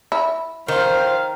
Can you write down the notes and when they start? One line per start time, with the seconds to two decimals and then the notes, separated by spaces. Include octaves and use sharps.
0.12 E4
0.68 D#3 C5 F5